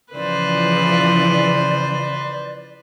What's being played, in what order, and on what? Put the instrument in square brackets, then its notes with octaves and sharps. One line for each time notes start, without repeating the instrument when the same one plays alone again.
[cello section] C#3 E3 F3 [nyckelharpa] B4 C5 [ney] D5